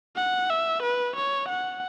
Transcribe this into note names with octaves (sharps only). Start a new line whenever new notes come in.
F#5
E5
B4
C#5
F#5